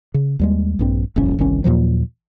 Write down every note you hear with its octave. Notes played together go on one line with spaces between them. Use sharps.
C#3
D#2 G3 G#3
A#1 G2 C4
D#1 A1 F2 C#4
G1 C2 D#3 C#4
D#2 A#2 F3 F#3